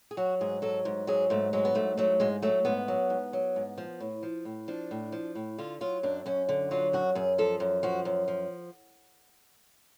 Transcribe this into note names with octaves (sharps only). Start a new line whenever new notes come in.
G#4
F#3 F#4
G#2 G#4
F#3 A4
G#2
F#3 G#4
G#2 A3
F#3 G#3
B3
G#2 A3
F#3 A3
G#2 G#3
F#3 A3
G#2 B3
F#3
G#2
F#3
G#2
F3
A2
F3
A2
F3 D4
A2
F3
A2
D3 F4
F#3 F4
F#2 D4
F#2 C#4
D3
F#3 F4
F#2 F#4
F#2 G#4
F3 A4
F#2
F3 F#4
F#2
F3